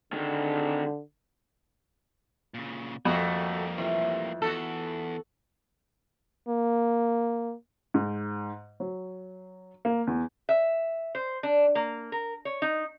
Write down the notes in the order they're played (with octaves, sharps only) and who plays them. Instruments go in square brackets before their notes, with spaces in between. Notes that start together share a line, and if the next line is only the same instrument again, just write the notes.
[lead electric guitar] G#2 D#3 [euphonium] D3
[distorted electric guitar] A#2 C#3
[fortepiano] F2 [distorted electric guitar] G3 A#3 [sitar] A3 F#4
[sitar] C3 [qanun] E3 A3 F4
[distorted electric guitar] E2 [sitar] F#4 A4
[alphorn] A#3
[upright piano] G#2
F#3
A#3
E2
[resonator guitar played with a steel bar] E5
C5
D4
A#3
A#4
C#5
D#4